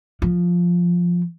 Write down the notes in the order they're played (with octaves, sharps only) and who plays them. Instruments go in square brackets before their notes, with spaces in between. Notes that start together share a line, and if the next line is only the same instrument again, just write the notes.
[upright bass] F3